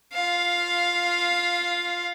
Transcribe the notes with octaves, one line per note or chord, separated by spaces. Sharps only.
F4 F5